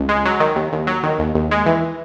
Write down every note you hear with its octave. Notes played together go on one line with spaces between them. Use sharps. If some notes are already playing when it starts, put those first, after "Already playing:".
Already playing: C#2
G#3
F#3
D#3
D#2
D#2
F#3
D#3
D#2
D#2
G#3
E3